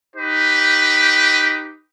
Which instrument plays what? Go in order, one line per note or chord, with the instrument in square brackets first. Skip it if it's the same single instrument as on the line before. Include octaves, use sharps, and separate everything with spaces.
[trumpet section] D#4 G4 B4